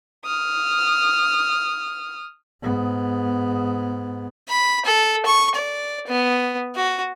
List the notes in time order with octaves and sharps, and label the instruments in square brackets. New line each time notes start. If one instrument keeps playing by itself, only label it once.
[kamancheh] D#6 F6
[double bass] G#2 B3
[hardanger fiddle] B5
A4
C#6
D5
B3
F#4